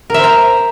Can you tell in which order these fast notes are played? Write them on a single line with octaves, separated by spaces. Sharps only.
A#4 E5 C5 A#5